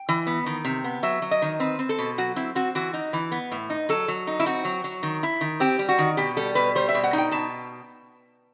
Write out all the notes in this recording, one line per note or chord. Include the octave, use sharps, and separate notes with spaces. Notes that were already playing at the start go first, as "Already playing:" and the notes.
Already playing: G5
E3
B3
D#3
C3
B3
F#3 E5
F#3
D#5
D#3
C4 B4
C4
A4
B2
F#3 F#4
C4 E4
C4 F#4
E3 F#4
D#4
E3
B3
A2
D#4
F#3 A4
F#3
D#4
E4
C4 F#4
F#3
F#3
D#3
E4
D#3
C4 G4
G3
F#4
D#3
B2 G4
G3 A4
B2 B4
G3 C5
E5
B2
F#5
D#4 G5
B2 A5